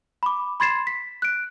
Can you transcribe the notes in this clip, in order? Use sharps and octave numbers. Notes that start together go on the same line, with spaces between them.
B5 D6
B5 C6 G#6 A6 C7 E7
B6
F#6 D7